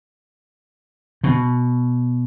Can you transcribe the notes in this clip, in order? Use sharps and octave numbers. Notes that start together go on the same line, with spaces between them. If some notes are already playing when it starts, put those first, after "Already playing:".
B2